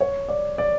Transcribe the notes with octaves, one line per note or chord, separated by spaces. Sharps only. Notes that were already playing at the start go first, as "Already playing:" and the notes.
C#5
D5
D5